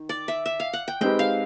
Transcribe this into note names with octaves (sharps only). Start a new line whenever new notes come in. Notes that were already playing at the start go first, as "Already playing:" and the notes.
Already playing: D#3
D5
E5
E5
F5
F#5
G5
G#3 C4 D#4 G4 B4 G5
F5